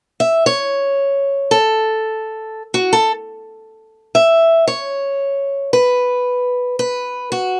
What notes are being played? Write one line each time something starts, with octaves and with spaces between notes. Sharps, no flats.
E5
C#5
A4
F#4
A4
E5
C#5
B4
B4
F#4